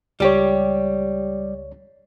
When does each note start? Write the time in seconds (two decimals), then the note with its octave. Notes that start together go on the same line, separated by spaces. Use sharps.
0.20 C#2 G3 G4 C#5